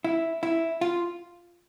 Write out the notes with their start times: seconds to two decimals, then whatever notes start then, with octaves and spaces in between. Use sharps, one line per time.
0.04 E4
0.43 E4
0.81 F4